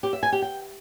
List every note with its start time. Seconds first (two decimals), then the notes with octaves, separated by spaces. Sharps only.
0.03 G4
0.13 E5
0.23 G#5
0.32 G4
0.42 G5